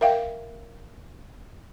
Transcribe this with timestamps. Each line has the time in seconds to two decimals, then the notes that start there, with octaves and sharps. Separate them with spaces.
0.01 A#4 E5 F5 G5